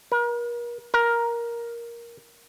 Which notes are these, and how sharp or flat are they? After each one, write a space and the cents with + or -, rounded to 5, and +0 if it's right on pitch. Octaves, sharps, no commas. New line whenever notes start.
A#4 +40
A#4 +10